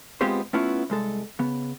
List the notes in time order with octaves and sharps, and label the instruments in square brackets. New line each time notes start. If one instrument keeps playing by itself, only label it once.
[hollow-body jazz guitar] G#3 B3 C4 F4 G4 C5
A3 B3 C#4 E4 F4
C2 G#3 A4
C#3 B3